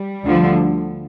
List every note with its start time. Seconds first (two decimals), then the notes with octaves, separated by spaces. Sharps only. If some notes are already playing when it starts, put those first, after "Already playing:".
Already playing: G3
0.23 D2 D3 F3